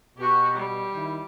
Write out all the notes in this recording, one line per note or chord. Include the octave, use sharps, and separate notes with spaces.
B2 F#4 G4
G3
D#3 E4